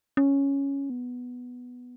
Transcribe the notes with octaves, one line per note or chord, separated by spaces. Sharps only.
C#4
B3